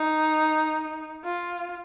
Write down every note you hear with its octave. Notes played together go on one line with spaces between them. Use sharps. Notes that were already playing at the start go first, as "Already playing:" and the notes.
Already playing: D#4
F4